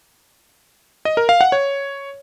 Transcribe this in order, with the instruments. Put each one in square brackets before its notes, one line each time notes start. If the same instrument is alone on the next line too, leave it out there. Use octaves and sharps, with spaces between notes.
[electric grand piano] D#5
A#4
F5
F#5
C#5